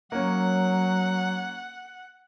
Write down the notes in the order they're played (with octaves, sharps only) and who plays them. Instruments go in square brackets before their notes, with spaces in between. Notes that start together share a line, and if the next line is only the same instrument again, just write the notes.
[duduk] F#3 [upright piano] A#3 C#4 [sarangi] F#5